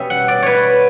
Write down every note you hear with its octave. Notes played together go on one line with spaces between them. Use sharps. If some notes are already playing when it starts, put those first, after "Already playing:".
Already playing: B2 G3 C#4 E5
F#5
D5
B4 C#5